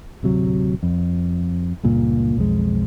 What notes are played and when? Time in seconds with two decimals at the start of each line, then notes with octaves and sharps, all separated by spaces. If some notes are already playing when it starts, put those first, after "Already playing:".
0.23 D1 C3 F#3
0.83 F2
1.83 C#2 G2 A#2
2.37 B1 F2 G#3